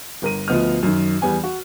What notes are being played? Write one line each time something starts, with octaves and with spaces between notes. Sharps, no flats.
G1 A#4 D#7
D2 F3 B3 D#5 F6
F#2 D#3
E2 G3 B3 G#5
F#4